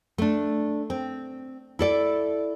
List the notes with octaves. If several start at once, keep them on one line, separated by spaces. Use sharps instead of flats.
A3 D4
C4
E4 A4 D5